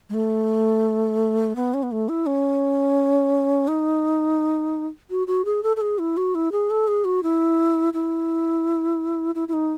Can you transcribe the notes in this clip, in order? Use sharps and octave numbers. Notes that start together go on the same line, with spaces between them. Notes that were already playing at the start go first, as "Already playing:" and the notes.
G#3
A3
B3
C#4
B3
A3
E4
C#4
D#4
F#4
F#4
G#4
A4
A4
G#4
E4
F#4
E4
G#4
A4
G#4
F#4
E4
E4
E4
E4
D#4